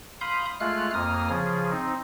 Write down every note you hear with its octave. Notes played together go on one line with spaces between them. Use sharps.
F5 B5 C6 D#6 G6
G#3 A3 F4 F5 F6 F#6
F2 A#3 D#6 F6
C#3 F3 G#4
C4 D#4